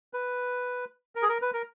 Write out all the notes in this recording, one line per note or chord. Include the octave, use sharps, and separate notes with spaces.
B4
A#4
G#4
A#4
B4
A#4